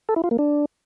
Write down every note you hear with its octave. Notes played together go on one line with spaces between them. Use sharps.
A4
E4
F4
A#3
D4